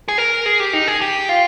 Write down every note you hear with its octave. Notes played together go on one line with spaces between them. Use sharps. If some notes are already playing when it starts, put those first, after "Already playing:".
G#4
A#4
G#4
G4
D#4
G#4
G4
F4